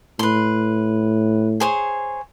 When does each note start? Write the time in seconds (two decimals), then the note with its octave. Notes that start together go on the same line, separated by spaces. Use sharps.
0.19 A2 B4 C6
1.60 G#4 C5 C#5